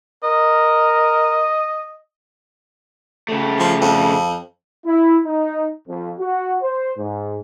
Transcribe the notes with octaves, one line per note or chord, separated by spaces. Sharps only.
A#4 D#5
C#3 A3
F3
F2
E4
D#4
F2
F#4
C5
G#2